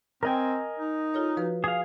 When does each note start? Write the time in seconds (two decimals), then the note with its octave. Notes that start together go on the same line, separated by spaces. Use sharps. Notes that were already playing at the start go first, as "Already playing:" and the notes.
0.23 C4 A#4 D#5 G5 G#5
0.79 D#4
1.14 F4 A4 C#5
1.37 F3 F#4 B4
1.64 G#4 F5